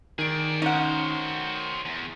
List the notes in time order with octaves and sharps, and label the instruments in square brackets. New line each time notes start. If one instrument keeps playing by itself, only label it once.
[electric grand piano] D#3 D7 [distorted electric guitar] G#4 D5
[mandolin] C#4 F#5 [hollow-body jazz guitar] D#4 [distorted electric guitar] F#4 C5
[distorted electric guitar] E2